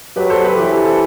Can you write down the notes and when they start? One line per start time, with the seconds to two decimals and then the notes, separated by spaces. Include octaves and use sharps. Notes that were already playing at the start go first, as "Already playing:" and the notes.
0.16 F#3 G4 B4
0.30 A4 C5
0.44 G4 B4
0.58 E3 G4
0.71 A4
0.85 A4 C5